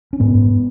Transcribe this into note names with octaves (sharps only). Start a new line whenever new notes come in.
C#4
G#2 B3
G#2